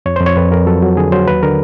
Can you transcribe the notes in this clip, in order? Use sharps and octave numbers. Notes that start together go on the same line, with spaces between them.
F2 C#5
F2 C5
C#5
F2 B4
F2 A#4
F#3 A4
F#3
D3 G#4
F#3 C5
D#2 B4
D3 A#4